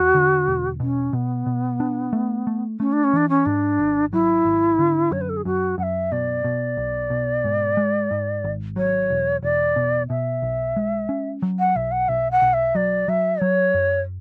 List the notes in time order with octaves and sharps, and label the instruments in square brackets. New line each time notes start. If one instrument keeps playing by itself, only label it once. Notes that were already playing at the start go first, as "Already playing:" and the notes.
Already playing: [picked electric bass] E2 [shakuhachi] F#4
[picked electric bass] D3
E1
[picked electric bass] B2 [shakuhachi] C#4
[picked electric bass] B2 [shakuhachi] B3
[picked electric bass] B2
D4
A3
A3
[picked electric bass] A3 [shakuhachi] C#4
[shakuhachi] D4
C#4
[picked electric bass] E3 [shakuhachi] D4
[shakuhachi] C#4
[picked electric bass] G#2 [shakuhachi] D4
[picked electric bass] G#1
[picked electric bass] F#3 [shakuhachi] E4
[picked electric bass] G#1
D3
[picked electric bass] F#2 [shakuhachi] C#5
[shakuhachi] B4
A4
G#4
[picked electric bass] F#2 [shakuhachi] F#4
[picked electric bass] F#2 [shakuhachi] F#5
[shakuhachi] E5
[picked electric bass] B2 [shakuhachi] D5
[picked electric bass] B2
B1
B2
G#2
G#3
G#2
G#1
[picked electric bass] F#3 [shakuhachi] C#5
[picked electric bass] E1
[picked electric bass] E1 [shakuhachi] D5
[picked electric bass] B2
[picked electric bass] B2 [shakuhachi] E5
[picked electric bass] B1
G#3
C#4
F#3
[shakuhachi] F#5
[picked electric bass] B1 [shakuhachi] E5
[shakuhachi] F#5
[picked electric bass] B1 [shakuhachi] E5
[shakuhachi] F#5
[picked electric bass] B1
[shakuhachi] E5
[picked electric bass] F#3 [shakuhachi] D5
[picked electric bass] F#3 [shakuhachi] E5
[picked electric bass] F#3 [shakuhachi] C#5
[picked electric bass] F#2